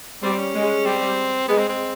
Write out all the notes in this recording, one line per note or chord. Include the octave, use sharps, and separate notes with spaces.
G3 C4
C#4
G#3
G3 C4
G#3 B3
C4
C4